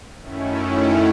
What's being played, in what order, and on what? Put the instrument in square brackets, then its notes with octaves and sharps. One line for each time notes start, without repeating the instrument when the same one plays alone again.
[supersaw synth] F#2 D#3 A3 C#4 E4